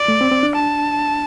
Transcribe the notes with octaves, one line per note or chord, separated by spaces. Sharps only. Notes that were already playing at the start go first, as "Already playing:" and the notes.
Already playing: D5
A3
C4
C4
D4
A5